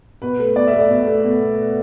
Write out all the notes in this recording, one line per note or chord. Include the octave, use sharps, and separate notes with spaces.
B2 B4
A3
B2 D5
E5
A3
D5
B2
A3
B2